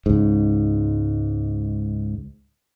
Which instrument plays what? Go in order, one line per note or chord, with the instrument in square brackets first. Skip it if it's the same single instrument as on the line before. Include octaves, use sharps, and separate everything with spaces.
[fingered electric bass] C#2 G#2